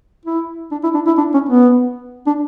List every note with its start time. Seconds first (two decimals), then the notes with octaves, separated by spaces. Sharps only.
0.25 E4
0.72 D4
0.84 E4
0.95 D4
1.07 E4
1.18 D4
1.34 C#4
1.49 B3
2.27 D4